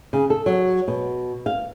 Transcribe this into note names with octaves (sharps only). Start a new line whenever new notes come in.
C#3
A4
F#3
B2
F5